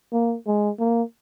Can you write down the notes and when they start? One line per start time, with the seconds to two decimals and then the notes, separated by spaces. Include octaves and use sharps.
0.12 A#3
0.47 G#3
0.79 A#3